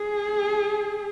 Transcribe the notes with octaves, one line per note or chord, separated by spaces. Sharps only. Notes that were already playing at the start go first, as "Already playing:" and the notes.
Already playing: G#4